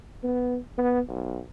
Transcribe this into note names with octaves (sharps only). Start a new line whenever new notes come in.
B3
B3
B1